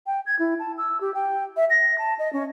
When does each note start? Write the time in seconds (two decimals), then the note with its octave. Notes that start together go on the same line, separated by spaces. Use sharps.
0.06 G5
0.26 G#6
0.39 E4
0.59 A5
0.78 E6
1.01 G4
1.14 G5
1.57 E5
1.70 A#6
1.98 A5
2.19 D#5
2.33 C#4